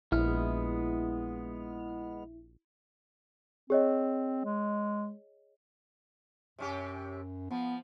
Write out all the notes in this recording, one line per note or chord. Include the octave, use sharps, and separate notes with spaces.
A#1 G#3 B3 E4 F6
C4 G#4 C#5 D#5
G#3
F#2 C3 C#4 G4
F3 B3